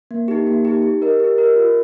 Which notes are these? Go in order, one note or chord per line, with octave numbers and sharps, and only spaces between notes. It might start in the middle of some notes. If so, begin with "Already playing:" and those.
A#3
D#4 G4
A#3
D#4 G4
G4
A#4 D#5
G4
A#4 D#5
F4